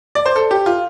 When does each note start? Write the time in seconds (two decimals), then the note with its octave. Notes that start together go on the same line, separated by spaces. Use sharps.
0.15 D5
0.26 C5
0.36 A4
0.51 G4
0.66 F4